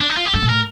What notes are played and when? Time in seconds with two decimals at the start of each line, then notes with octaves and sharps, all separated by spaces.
0.01 D4
0.09 D#4
0.17 F4
0.25 G4
0.33 G2 A4
0.42 A#2
0.49 A2 A#4